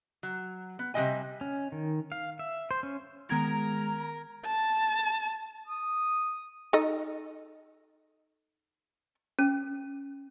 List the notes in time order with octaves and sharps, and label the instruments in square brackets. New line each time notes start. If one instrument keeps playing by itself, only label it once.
[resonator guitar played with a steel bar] F#3
B3
C3 G3 G#3 D4 D#5 G#5
[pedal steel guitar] C#4
D#3
F5
E5
C5
C#4
[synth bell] D#3 B3 G#6 [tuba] G#3 [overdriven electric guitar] A#4 [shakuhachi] A#5
[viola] A5
[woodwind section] D#6
[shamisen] D#4 A4 D#5
[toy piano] C#4